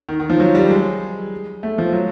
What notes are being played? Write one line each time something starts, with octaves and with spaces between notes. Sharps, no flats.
D#3
D#3
F3
F#3
G3
G#3
A3
F3
F#3